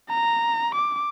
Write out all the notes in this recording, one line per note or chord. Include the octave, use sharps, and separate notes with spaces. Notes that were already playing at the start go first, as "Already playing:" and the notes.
A#5
D6